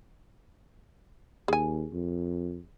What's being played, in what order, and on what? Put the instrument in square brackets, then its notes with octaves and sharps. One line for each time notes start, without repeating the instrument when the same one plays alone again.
[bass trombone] D#2 [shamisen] G#4 G#5
[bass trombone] F2